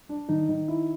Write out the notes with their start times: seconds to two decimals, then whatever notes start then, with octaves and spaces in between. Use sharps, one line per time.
0.09 D4
0.29 D#3 D#4
0.49 D#3
0.68 E4